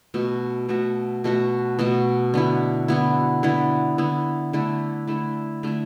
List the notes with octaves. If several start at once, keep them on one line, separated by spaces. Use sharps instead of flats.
B2 A3 F#4
B2 A3 F#4
B2 A3 F#4
B2 A3 F#4
D3 B3 E4
D3 B3 E4
D3 B3 E4
D3 B3 E4
D3 A3 E4
D3 A3 E4
D3 A3 E4